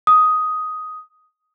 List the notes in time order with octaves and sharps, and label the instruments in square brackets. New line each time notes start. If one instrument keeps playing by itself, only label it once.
[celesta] D#6